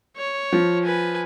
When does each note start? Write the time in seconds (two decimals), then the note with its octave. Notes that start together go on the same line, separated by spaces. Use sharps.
0.17 C#5
0.53 F3
0.84 B4 G#5